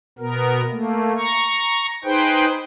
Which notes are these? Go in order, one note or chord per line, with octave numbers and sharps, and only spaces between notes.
B2 B3 A#4
A3 A#3
A#5 C#6
D#4 G#4 B4 C5 G5